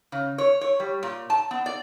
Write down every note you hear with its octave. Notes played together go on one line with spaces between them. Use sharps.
C#3
C#5
C#5
G3
A#2
A5
B3
D5